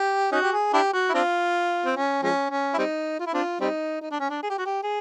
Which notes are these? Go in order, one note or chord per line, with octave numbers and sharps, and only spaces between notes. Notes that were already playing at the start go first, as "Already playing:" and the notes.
Already playing: G4
C#4 D#4 F#4
G4
G#4
D4 E4 G4
F#4
E4
C4 D4 F4
C4
C#4
F3 G#3 C#4
C#4
E4
G3 C4 D#4
F4
E4
C4 D4 F4
G3 C4 D#4
D#4
D4
C#4
D4
G#4
G4
F#4
G4
G#4